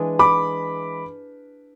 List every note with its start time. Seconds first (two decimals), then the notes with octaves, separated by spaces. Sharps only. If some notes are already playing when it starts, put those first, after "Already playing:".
Already playing: E3 G#3 D4
0.19 B5 D6